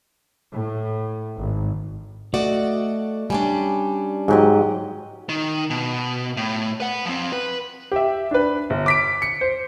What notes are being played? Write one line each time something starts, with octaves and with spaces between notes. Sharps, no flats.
A2
G#1
A3 F#4 D5 D#5
G3 C#4 D4 G#5
G#2 F#3 G#3 G4 D#5
D#3
B2
A2
B4 F#5
F3 C4
B4
G4 E5
D4 B4
G1
D6 B6 D7
C#7
C5